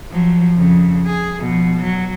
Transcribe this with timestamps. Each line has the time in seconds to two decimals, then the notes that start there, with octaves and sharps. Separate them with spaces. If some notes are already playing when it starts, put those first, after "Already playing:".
0.11 F3 F#3
0.56 F2 C#3
1.06 G#4
1.41 B2 F3
1.79 F#3